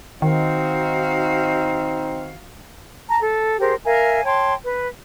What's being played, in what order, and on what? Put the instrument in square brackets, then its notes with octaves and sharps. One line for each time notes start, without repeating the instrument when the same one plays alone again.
[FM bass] D#3 [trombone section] C4 D#4 [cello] F#4 F5
[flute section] A5 A#5
A4
G4 G#4 A#4 C5
A#4 E5 F5 G#5
C#5 G5 A5 C6
B4